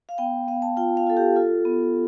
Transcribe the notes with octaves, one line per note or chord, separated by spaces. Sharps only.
F5
B3 G5
B3 F5
A5
F4 G5
F5
F4 A4
G4
F4 A4
B3